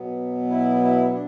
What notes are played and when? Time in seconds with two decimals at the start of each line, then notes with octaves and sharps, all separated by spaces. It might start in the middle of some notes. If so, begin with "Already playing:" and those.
Already playing: B2 F#3 B3
0.50 E4
0.81 E4
1.12 D4